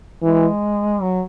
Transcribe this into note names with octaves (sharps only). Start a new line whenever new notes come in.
E3 G#3
F#3